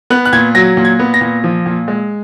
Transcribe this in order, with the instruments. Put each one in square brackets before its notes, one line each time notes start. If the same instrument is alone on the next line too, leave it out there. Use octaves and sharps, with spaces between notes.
[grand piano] B3 F#6
F#6
A#2 G#6
F#3 A#6
A#2
G#6
B3
A#6
A#2
F3
A#2
G#3